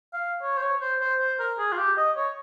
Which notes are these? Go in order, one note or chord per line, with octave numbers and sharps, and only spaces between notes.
F5
C#5
C5
C#5
C5
C5
C5
A#4
G#4
F4
G4
D#5
C#5